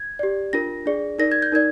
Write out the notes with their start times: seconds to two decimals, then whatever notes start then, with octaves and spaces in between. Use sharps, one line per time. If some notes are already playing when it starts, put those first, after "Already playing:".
Already playing: G#6
0.19 G4 D5
0.53 D4 F4 A#4 A#6
0.86 D4 G#4 D5
1.19 D#4 A#4 D5 A#6
1.32 G#6
1.42 G6
1.52 D#4 A#4 D5 G#6